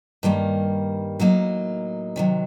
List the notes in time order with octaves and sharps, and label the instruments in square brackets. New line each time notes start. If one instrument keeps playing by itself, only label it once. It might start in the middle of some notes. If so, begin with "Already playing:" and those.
[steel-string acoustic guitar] G2 D#3 G3 A#3
A2 F#3 A#3 D#4
C3 D#3 F#3